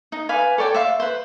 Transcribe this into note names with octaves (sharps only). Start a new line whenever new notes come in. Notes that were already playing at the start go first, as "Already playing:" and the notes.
D#4
B4 D5 F5 G#5
A4 C#5 D5 G5
E5 F5 C6
B4 C5